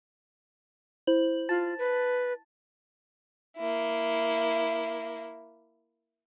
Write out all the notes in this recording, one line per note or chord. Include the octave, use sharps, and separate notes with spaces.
E4 C5 F#7
F4 A5 A6
B4
A#3 E4